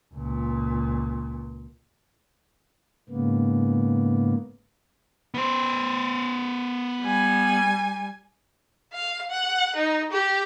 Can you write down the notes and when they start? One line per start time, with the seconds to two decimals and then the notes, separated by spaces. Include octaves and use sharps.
0.14 C#2 A#2
3.09 G#2 C#3 A#3 B3
5.34 B3 C5
7.01 G3 G#5
8.93 F5
9.31 F#5
9.76 D#4
10.12 G4